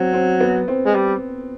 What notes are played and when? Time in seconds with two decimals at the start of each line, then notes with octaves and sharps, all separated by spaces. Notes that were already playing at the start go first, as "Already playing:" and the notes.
Already playing: F#3 C4
0.13 C4
0.40 B3
0.68 C4
0.85 G#3
0.95 G3